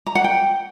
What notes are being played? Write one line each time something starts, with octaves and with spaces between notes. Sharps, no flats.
A#5
F#5
G5